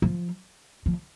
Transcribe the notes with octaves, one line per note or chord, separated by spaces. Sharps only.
F3
F3